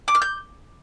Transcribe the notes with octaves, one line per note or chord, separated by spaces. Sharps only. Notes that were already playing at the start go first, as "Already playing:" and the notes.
D6
F6
G6